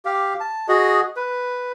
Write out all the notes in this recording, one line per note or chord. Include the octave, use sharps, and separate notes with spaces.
G4 F5
A5
F#4 G#4 D#5
B4